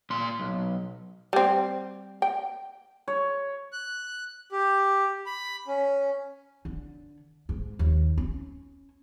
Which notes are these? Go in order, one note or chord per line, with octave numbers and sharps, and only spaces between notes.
A#2 C6
B1
G3 C4
G5
C#5
F#6
G4
B5
C#4
D3
G#2
D#2
C#4